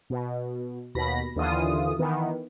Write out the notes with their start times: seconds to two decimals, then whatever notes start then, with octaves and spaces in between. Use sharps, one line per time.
0.10 B2
0.95 D#2 B2 B5 A#6
1.36 D#2 D3 E3 F4 D#6
1.99 D#3 E3 B3